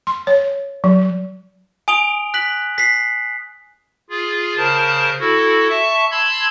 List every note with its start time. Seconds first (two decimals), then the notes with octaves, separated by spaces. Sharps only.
0.07 C6
0.27 C#5
0.84 F#3
1.88 G#5 D#6 D7 F7 G7
2.34 F#6 B6 F#7
2.78 B6 C7
4.10 F4 G#4
4.57 C#3 A#4 C5 A5
5.20 E4 F#4 A4
5.70 E5 A5 C#6
6.11 A5 B5 C6 E6 G#6